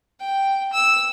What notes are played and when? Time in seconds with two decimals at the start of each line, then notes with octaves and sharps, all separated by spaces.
0.20 G5
0.73 E6